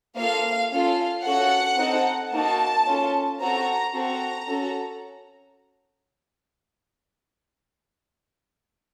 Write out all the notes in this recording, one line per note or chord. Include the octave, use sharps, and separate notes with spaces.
A#3 F4 A4 F5
C#4 F4 A4 F5
C#4 F#4 A4 F#5
C4 D#4 A4
A#3 D#4 F#4 A5
C#4 F4 A4
C4 F#4 A4 A#5
C4 F#4 A4 A#5
C#4 F#4 A4